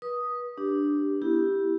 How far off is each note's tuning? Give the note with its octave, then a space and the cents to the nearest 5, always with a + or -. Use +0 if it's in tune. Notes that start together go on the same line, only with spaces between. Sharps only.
B4 -30 D#6 +0
D4 +0 G4 +0
B3 -20 E4 +0 G4 +0